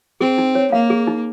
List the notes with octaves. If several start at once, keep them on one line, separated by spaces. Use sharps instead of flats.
C4 G#4
D#4
C#5
A#3 F5
G#4
D#4